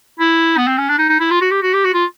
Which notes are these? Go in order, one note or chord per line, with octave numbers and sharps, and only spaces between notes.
E4
B3
C4
C#4
D4
D#4
D#4
E4
F4
F#4
G4
F#4
G4
F#4
F4